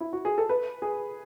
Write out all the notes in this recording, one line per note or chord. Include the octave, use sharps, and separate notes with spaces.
E4
F#4
G#4
A4
B4
G#4